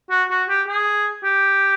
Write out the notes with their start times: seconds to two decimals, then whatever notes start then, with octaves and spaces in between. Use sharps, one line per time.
0.10 F#4
0.30 F#4
0.49 G4
0.68 G#4
1.24 G4